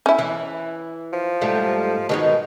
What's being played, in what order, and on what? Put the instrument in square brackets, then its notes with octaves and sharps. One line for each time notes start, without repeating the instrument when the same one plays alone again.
[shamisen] C#4 E4
[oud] E3
[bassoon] F3
[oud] G#2 G3 A3
[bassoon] B2 [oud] D#3 G#3 D#4